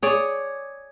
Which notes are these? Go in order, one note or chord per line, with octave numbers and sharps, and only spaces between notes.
G#4 C#5 D5